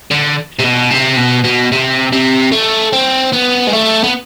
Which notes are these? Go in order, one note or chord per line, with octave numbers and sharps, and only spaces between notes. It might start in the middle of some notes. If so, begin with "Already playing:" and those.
D3
C3
B2
C3
B2
B2
C3
C3
A3
C4
B3
G#3
A3
B3